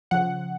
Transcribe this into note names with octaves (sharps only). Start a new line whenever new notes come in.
C#3 F3 F#5